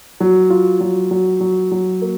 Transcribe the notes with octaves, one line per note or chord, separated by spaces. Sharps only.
F#3
F4
F#3
F#3
F#3
F#3
A#3